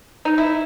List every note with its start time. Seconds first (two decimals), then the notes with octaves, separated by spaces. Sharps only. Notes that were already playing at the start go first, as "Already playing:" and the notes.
0.25 D#4
0.38 E4